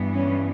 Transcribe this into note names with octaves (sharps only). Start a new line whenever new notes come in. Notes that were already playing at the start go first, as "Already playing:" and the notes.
Already playing: G2 E3 B3
C#4